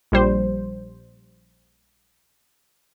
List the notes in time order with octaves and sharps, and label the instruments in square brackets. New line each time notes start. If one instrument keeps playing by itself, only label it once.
[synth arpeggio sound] A#1 G3 C5